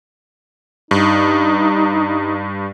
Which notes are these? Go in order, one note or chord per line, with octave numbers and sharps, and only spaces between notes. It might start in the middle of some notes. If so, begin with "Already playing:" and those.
G2 D#4